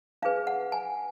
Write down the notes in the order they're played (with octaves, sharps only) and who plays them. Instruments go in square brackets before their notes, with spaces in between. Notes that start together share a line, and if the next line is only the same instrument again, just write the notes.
[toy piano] D4 G#4 B4 F5
F#5
G#5